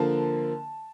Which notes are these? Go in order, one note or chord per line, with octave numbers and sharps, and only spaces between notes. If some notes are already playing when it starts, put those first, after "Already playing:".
Already playing: D3 F3 A#3 A5